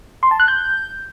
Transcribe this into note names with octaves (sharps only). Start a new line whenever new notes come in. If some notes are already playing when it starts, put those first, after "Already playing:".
C6
A5
F#6
G6